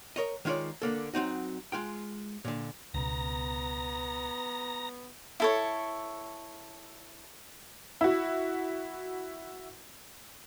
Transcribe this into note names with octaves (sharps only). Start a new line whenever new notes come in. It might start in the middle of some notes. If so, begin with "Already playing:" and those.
A#4 C#5 D#5
D#3 G#3 F4 C#5 D5
D3 A#3 A4
F#3 C4 D#4 F#4
G#3 F4 G5
A#2 D3
C#2 B2 B3 A#5 A#6
E4 A4 C#5
E4 F#4